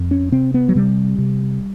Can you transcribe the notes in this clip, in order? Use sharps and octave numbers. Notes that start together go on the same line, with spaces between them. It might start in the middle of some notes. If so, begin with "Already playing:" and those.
Already playing: F2
C#4
C3 C4
B3
F#3
C3 G3
C3